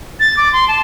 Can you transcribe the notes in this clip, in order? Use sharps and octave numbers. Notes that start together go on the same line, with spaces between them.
A6
D6
C6
A5